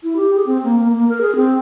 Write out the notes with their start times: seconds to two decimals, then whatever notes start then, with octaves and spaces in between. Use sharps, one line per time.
0.03 E4
0.16 G4
0.35 G#4
0.46 C4
0.64 A#3
0.79 A#3
0.93 A#3
1.09 A#4
1.21 G#4
1.36 C4